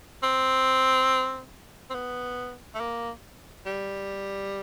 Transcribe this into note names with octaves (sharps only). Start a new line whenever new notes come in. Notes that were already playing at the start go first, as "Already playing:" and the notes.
C4
C4
B3
A3
A#3
G3